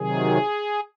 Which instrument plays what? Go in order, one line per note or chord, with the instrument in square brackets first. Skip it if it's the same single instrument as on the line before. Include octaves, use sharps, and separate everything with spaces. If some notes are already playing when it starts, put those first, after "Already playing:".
Already playing: [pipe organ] C3 D#3 F#3 G#4